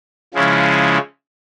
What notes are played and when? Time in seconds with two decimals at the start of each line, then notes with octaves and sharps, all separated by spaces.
0.34 C#3 F3 G#3 C#4 E4